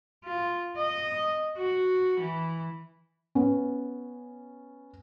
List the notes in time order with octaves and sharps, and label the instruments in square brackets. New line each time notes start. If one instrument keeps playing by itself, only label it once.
[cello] F4
D#5
F#4
E3
[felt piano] B3 C#4